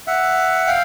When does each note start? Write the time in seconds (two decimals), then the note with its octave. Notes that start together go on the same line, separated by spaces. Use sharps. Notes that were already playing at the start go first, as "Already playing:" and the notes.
0.07 E5 F#5
0.67 F5 G5